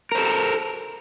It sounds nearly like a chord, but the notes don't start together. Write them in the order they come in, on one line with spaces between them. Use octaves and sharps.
A#4 C5 A4